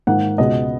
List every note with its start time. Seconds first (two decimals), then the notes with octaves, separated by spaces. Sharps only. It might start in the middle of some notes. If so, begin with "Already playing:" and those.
0.07 G#2 D#3 A#3 F#5
0.38 C#2 B2 G#3 B3 D#5